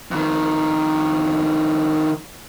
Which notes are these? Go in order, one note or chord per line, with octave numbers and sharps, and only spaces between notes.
F2 D#3